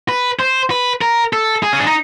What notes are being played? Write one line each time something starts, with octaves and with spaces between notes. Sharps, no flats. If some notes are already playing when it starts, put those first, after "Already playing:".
B4
C5
B4
A#4
A4
G#4
C#4
D4
D#4